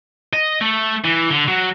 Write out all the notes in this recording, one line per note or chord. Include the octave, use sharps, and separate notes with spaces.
D#5
A3
E3
D3
F#3